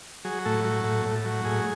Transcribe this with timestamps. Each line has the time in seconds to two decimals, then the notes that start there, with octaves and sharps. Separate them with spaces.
0.25 F#3 G#4
0.45 A2 A4
0.65 F#3
0.84 A2
1.05 A2
1.25 F#3
1.44 A2 G#4